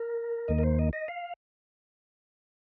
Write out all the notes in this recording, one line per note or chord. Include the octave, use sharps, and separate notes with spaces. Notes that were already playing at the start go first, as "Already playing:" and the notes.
Already playing: A#4
D#2 D#3 A#3 D#5
A#4
C5
D#5
D#5
F5